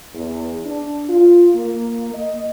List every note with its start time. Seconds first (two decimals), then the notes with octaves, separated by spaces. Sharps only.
0.14 E2
0.65 D4
1.08 F4
1.55 A#3
2.14 D#5